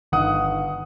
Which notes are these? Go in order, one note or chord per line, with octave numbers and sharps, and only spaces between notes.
G1 D#3 F#5 D#6